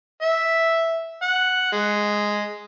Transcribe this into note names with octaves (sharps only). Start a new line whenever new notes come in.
E5
F#5
G#3